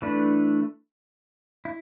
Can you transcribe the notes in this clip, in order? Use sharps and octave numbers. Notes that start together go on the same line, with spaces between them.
E3 A3 D4 B4
E4